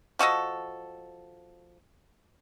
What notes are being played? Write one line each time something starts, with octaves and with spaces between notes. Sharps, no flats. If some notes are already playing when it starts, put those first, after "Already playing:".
F3 F#4 A4 D#5